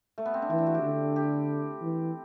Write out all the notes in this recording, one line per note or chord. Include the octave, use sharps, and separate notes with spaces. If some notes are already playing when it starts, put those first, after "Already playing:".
A3
B3
C4
D4
E3 E4
D4
F#4
G4
D3
G4
E3